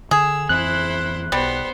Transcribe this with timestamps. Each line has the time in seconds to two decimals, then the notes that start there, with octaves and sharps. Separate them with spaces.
0.11 D3 G#4 E6
0.49 F2 E3 C4 E4 C5 F#6
1.32 B1 G3 B3 C5